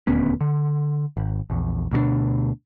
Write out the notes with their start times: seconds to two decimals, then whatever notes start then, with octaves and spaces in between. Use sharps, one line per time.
0.07 D#1 D2 B3 C#4
0.41 D3
1.17 G#1
1.50 A#1 E2
1.92 D2 B2 G#3 D4